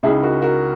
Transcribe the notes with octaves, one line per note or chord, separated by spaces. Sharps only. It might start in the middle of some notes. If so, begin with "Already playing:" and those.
C#2 C#3 G#3 D#4 E4 G#4
F#4 A#4
F#4 A#4